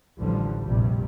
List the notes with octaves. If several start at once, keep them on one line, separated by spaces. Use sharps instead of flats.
A1 D2 D3 F3 G3
F1 A#1 G2 C3 G3